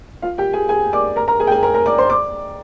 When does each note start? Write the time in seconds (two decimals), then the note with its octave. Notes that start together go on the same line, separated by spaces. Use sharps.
0.22 F4 F5
0.38 G4 G5
0.53 G#4 G#5
0.69 G#4 G#5
0.93 D5 D6
1.16 A#4 A#5
1.28 A#4 A#5
1.40 G#4 G#5
1.47 G5
1.51 G#4 G#5
1.63 A#4 A#5
1.74 A#4 A#5
1.86 D5 D6
1.98 C5 C6
2.09 D5 D6